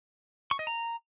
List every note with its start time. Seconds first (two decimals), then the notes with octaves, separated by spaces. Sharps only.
0.51 C#6
0.59 D#5
0.67 A#5